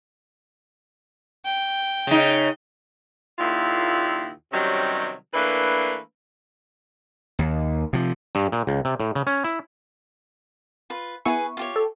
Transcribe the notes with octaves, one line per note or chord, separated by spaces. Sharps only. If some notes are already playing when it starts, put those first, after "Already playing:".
G5
C#3 D#4
D#2 A#2 C#3 E4 F4
C3 D#3 F#3 G3 C#4
E3 A3 A#3 D4 B4
D#2
C3 F3
G2
A#2
C#2
C3
A2
C#3
C#4
E4
F4 B4
B3 E4 G#4 B4 G#5 C#6
F4 G4 C#5
A4